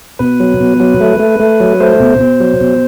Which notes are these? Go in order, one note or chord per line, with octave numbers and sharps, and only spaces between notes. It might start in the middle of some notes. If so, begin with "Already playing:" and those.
B2 B4
F#3
B2
F#3
A3
A3
A3
F#3
A3 C5
B2
B2
F#3
B2